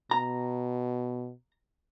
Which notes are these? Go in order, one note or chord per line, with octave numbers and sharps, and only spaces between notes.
B2 A#5